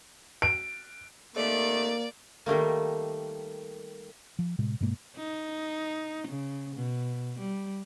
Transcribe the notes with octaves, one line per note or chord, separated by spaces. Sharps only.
D7
C3 D#3 A3 A#3 D5
D#3 G3 A3 A#3
F3
A2 C3 G#3
G2 B2 G#3 A#3
D#4
C#3
B2
G3